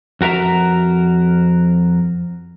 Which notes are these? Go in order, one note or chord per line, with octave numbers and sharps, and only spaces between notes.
F2 F#4 A#4 E5 A#5